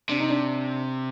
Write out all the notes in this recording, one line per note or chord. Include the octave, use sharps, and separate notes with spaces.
C3 D4
D#4
D4